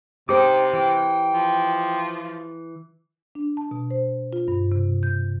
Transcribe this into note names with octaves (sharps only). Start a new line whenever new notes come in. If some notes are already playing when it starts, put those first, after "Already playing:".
C3 D#4 G4 C5 G5 D6
E3 G5
F3
D4
A5
B2
C5
F4
G2
C3
G6